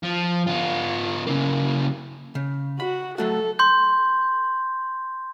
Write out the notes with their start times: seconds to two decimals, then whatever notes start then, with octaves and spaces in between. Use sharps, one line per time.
0.03 F3
0.47 B3 F4
1.27 C#3 A#3
2.35 C#3
2.80 F#4 B5
3.18 F#3 A3 F#4 A4
3.59 C6 G6